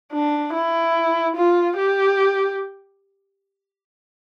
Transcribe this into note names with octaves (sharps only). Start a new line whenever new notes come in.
D4
E4
F4
G4